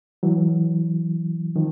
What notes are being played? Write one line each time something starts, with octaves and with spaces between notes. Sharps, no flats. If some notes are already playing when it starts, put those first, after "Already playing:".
E3 F#3
D#3 F3